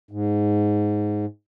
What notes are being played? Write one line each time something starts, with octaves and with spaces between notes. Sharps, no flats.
G#2